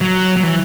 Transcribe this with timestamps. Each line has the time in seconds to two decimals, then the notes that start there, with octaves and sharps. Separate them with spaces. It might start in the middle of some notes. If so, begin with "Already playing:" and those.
0.01 F#3
0.37 F#3
0.43 E3